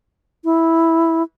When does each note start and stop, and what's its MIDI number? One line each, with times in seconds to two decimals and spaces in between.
0.45 1.23 64